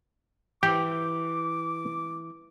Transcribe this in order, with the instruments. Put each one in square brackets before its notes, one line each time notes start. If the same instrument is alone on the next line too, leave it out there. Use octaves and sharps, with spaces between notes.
[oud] E3 [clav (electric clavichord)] G4 [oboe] D6